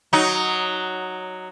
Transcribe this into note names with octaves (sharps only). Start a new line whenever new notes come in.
F#3 D#4